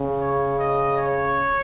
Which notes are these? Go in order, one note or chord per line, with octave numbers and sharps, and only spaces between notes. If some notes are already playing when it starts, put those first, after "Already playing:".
Already playing: C#3
C#5
D#5
C#5